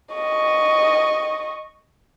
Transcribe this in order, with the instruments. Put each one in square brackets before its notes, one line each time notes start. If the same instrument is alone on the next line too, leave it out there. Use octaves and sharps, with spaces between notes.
[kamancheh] D#5 C#6